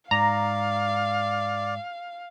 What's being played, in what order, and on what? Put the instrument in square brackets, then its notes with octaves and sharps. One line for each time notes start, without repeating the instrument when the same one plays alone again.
[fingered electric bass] G#2 [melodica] D5 [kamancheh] F5 [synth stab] A#5